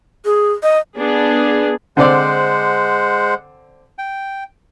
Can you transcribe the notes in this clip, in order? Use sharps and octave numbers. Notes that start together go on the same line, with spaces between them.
G#4
D#5
B3 D4 G#4
D3 G#3 C4 C5 D5 F#5
G5